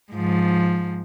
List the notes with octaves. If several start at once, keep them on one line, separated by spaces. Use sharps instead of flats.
G#2 F3